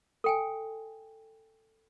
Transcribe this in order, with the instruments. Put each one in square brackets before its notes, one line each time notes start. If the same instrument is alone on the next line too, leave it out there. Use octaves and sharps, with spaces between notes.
[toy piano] A4 G5 G#5